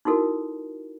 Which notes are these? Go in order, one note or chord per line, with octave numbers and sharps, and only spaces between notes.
D#4 E4 F#4 A4 A#4